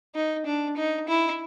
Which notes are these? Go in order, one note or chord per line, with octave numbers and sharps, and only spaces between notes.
D#4
D4
D#4
E4